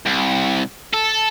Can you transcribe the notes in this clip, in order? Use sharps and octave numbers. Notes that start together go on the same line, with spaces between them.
C2
A4